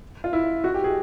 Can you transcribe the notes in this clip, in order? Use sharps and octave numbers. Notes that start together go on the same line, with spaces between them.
F4
E4
F#4
G4
G#4